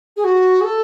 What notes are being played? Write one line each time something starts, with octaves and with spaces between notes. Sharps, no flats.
G#4
F#4
G#4
A4